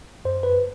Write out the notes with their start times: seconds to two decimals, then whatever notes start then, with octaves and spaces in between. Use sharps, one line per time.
0.25 F#2 C5
0.43 B4